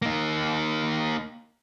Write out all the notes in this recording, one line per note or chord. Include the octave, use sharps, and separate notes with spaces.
A#3 D#4